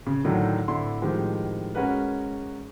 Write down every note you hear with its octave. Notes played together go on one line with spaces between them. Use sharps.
C#3
A2 D3 D#3 F#3 D4 D#4
D1 D3 E4 C6
A2 D#3 F3 G#3 C4 G4
G#3 C#4 F#4 A#4 B4